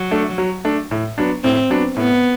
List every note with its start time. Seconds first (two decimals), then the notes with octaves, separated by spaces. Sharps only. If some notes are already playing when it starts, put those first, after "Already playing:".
Already playing: F#3
0.11 A3 D4
0.38 F#3
0.65 A3 D4
0.91 A2
1.18 F#3 B3 D4
1.43 A2 C4
1.70 F#3 B3 D4
1.97 A2 B3